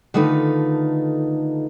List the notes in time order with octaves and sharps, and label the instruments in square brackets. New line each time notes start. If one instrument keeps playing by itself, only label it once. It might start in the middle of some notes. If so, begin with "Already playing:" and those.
[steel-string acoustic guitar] D3 D#3 A3 D#4 F4 B4